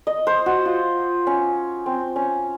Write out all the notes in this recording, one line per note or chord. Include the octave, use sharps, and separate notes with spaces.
D#5
C5
F#4
F4
C#4
C4
C#4